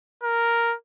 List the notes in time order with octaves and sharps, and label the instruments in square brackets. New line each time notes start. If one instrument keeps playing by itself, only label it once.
[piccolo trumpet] A#4